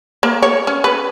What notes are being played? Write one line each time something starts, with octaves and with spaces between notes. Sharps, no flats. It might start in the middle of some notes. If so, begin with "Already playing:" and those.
A#3
C#5
C#4
B4